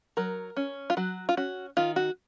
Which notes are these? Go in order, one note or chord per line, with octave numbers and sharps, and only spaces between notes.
F#3 A#4
C#4
F4
F#3 F#4
F4
C#4 F#4
D#3 F4
F#4